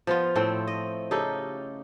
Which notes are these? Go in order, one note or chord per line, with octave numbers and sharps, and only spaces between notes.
F3 B3 F4
A2 A3 C4 G5
D#5
C#3 D#4 G4 A4